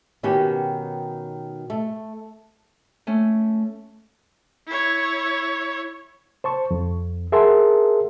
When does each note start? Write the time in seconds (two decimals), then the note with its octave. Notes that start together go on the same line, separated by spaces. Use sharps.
0.23 B2 D#3 B3 C#4 F#4 G4
1.70 A3
3.07 A3 C#4
4.68 E4 C#5
6.44 C5 A5 C#6
6.71 F2
7.32 G#4 A#4 E5 F#5 A5 C6